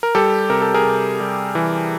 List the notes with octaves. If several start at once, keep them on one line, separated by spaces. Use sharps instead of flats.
A#4
G3 G4 A4
C3 A#4
A4
G#4 A#4
C3
G3
E3